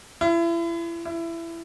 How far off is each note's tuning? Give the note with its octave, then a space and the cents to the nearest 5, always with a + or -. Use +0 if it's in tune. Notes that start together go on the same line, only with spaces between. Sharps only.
E4 +35
E4 +20